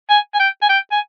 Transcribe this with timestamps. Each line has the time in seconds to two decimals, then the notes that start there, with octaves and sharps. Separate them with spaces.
0.10 G#5
0.34 G#5
0.40 G5
0.62 G#5
0.69 G5
0.91 G#5